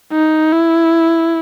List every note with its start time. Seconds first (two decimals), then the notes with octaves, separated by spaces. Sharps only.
0.13 D#4
0.52 E4